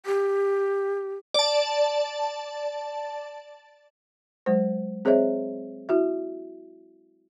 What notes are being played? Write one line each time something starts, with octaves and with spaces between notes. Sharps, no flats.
G4
D5 A5
F#3 G#3 C5
C4 G#4 C5 C#5 D#5 E5
E4 F#4 E5